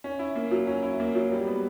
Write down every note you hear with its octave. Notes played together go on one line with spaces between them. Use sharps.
C#4
E4
A#3
F#3
C#4
E4
A#3
F#3
G3
B3